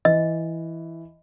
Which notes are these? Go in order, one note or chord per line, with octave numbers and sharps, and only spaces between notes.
E3 D#5